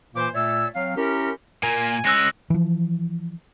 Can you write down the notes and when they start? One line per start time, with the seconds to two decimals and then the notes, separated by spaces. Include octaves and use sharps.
0.15 A#2 E3 A#3 B4 C5 D6
0.34 A#2 A3 C#5 D5 E5 E6
0.75 F#3 C4 F5
0.97 C#4 E4 G4 A#4
1.63 A#2 A#3 G#5
2.05 G#3 C#4 E6 F#6 A#6
2.50 E3 F3